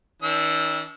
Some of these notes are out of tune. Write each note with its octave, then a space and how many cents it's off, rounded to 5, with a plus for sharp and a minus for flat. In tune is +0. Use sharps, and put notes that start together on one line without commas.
D#3 +45 D4 -30 E6 +0